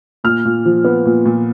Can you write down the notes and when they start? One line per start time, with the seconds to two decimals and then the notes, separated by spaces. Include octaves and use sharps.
0.24 A#2 F6
0.45 A#2
0.65 F3
0.84 B3
1.05 A#2
1.25 A#2